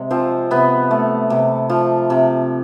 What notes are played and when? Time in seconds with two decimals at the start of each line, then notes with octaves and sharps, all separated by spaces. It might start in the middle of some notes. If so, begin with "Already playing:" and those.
Already playing: C3 G#3
0.11 F3 C4
0.51 C3 B3
0.91 A3
1.30 C3
1.70 F3
2.10 C3